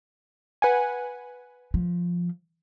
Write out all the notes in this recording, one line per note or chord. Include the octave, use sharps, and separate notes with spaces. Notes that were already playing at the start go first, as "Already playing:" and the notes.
B4 F#5 G#5
F3